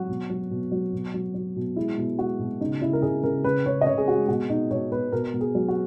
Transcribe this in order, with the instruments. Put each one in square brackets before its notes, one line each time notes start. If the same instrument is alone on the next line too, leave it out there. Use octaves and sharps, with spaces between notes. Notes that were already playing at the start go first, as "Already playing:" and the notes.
Already playing: [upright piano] F#3 F#4
B2
F#3
B2
F#3
B2
F#3
F#3
B2
G#3 E4
B2
G#3 F#4
B2
C#3 D#4
C#3 E4
A#4
C#3 G#4
C#3 A#4
C#3 B4
C#3 C#5
D#5
C#3 C#5
G#4
G#3 F#4
B2 F#4
B2 D#4
B2 C#5
B2 B4
B2 A#4
B2
G#4
F#3
F#4